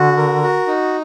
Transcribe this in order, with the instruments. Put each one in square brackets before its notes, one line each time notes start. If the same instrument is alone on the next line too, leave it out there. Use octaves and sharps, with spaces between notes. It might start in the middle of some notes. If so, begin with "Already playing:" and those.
Already playing: [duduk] D3 [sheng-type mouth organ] F#4
[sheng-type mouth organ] A#4
F#4
D#4